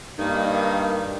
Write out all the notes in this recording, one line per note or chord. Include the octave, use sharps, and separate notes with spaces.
G2 D#3 A#3 D#4